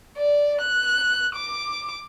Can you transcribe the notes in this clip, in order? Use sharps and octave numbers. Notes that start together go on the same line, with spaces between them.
D5
F#6
D6